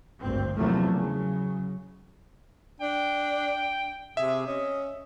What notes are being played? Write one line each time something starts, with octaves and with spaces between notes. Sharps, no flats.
G#1 D2 G2 C4
E2 C3 F3 F#3 A3 A#3
C#3 F#3
D4 G5
C3 G#4 E5
C#4 D#5